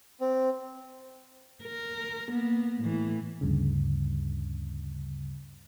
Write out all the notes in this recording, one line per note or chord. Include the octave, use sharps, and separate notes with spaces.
C4
A#4
A#3 B3
A2 E3
D2 G2 C#3